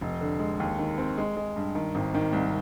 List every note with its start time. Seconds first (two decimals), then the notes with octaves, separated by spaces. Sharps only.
0.01 F1
0.21 D3
0.39 G#3
0.60 D#2
0.79 D#3
0.98 C4
1.18 G#3
1.37 G#3
1.56 G2
1.75 D#3
1.95 G#1
2.14 D#3
2.33 C2